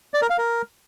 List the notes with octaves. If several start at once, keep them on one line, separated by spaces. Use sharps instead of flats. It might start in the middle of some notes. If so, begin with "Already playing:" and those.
D5
A#4
F5
A#4